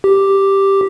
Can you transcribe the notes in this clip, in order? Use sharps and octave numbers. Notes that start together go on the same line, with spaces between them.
G4